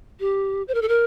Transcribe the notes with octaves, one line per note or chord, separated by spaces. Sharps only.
G4
C5
A#4
A4
A#4